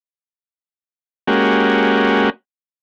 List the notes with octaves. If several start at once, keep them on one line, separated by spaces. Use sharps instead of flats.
G#3 A#3 C#4 F#4 G4